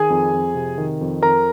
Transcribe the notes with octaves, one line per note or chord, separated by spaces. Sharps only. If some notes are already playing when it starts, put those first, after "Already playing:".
Already playing: D#3 G#4 G#5
F2
F2
C3
D#3
F2
F2 A#4 A#5